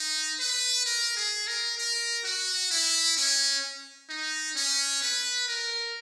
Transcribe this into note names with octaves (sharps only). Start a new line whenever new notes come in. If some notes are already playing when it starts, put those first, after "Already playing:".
Already playing: D#4
B4
A#4
G#4
A#4
A#4
F#4
E4
C#4
D#4
C#4
B4
A#4